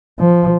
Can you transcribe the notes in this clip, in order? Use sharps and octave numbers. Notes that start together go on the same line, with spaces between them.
F3